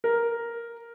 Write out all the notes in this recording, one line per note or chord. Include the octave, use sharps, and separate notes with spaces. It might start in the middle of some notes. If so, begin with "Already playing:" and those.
A#4